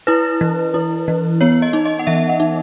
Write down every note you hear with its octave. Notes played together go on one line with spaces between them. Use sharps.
E4 B4
E3
E4
E3
B3 C#5
D#5
D#4
D#5
F#5
E3 E5
F#5
D#4